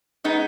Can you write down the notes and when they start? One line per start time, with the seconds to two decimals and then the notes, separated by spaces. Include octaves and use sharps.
0.24 G#3 B3 D#4